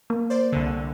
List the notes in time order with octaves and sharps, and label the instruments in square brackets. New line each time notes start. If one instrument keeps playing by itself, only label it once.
[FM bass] A#3
[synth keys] C5 D5
C2 D3